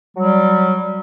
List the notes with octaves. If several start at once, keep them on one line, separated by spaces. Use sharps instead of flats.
F#3 G3